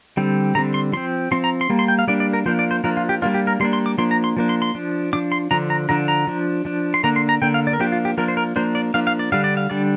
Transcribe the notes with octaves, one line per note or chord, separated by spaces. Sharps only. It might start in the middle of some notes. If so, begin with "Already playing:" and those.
D3 G3 C4
D3 G3 C4 A#5
C6
F3 C4 C6
F3 C4 C6
A#5
C6
G3 A#3
C6
G5
F5
G3 A#3 D4 D5
D5
A#4
F3 A#3 D4 C5
D5
C5
F3 A#3 D4 A#4
F4
G4
G3 A#3 D4 F4
G4
A#4
G3 A#3 D4 C6
C6
D6
F3 A#3 D4 C6
A#5
C6
F3 A#3 D4
C6
C6
F3 D4
F3 D4 D6
C6
D3 F3 D4 A#5
A#5
D3 F3 D4 A#5
A#5
F3 D4
F3 D4
C6
D3 A#3 D4 A#5
C6
A#5
D3 A#3 D4 G5
F5
D5
A#4
F3 A#3 D4 G4
F4
G4
F3 A#3 D4 A#4
C5
A#4
F3 A#3 D4 C5
D5
F3 A#3 D4 F5
F5
D5
D3 G3 D4 F5
D5
F5
D3 G3 D4 D5